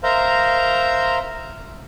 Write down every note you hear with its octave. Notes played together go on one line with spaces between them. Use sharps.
A#4 C5 E5 F5 A#5